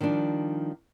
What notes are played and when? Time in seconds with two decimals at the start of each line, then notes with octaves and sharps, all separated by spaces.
0.01 D#3 F3 G3 D4